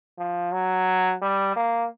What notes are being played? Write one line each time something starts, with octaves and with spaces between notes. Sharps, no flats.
F3
F#3
G3
A#3